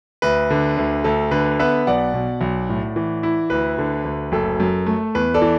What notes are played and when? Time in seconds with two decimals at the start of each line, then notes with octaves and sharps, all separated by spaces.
0.22 D2 B4
0.50 D3
0.77 D2
1.04 D2 A4
1.31 D3 B4
1.59 B3 B4 E5
1.87 B1 D5 F#5
2.14 B2
2.41 B1
2.69 A2
2.96 E3
3.23 E4
3.50 D2 B4
3.78 D3
4.05 D2
4.32 F#1 A4
4.60 F#2
4.87 A3
5.15 E2 B4
5.34 A4 D5
5.42 E3